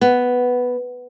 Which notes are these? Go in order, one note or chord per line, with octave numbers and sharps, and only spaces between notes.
B3